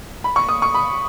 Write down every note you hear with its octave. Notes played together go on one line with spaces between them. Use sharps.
B5
C#6
D#6
C#6
B5